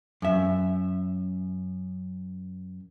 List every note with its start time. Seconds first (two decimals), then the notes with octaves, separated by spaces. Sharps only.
0.22 F#2 E5